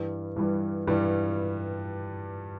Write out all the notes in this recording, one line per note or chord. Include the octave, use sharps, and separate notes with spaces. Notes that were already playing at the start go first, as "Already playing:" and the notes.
Already playing: G2 E3 G3
G2 E3 G3
G2 E3 G3